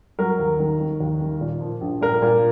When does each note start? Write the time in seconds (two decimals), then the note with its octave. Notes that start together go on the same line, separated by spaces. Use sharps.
0.19 F#3 A#4
0.39 D#2
0.59 D#3
0.80 D#3
1.00 D#2
1.21 D#3
1.41 A#2
1.61 F3
1.81 A#1
2.01 A#2 A#4
2.22 A#2